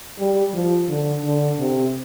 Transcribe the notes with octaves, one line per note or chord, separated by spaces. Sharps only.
G3
F3
D3
D3
C3